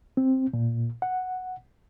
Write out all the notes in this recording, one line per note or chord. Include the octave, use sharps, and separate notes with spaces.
C4
A#2
F#5